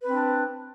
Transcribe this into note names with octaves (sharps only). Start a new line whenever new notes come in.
C4 D4 B4